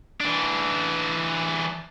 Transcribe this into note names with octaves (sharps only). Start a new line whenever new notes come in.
E3 D4